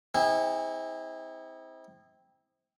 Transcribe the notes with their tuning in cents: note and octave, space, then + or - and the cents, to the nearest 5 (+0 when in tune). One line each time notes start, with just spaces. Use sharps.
C4 +0 E4 -45 G#4 -25